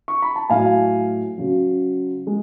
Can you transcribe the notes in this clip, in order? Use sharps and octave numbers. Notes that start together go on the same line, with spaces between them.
C#6
B5
A5
A2 F#3 F5 G#5
C#3 F#3
G#3